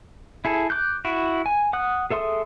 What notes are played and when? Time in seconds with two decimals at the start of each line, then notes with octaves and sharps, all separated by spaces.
0.45 E4 G#4 A4
0.70 D6 F#6 G6
1.05 E4 F#4
1.46 G#5
1.73 F#5 D#6 F#6
2.10 G#4 A4 E5 C6 D#6